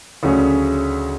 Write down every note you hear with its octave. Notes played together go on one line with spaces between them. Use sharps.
D2 C#3 F#3 C#4 G#4